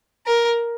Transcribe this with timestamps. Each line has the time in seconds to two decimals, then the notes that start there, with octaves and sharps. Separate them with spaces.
0.26 A#4